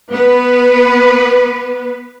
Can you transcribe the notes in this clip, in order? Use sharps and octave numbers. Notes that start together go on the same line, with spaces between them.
B3 B4